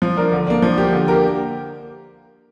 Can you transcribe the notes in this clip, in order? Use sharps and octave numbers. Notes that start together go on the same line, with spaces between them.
F3
D4 A#4
D3
A#3 D4
F3
A#3 G4
D3
A#3 G4 A#4